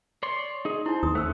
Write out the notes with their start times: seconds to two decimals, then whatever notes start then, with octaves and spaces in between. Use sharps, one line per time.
0.23 C#5 D5 C6
0.65 D#4 G#4
0.86 D#4 E4 C5
1.03 D#2 D#6
1.15 A3 C#4 C5 E6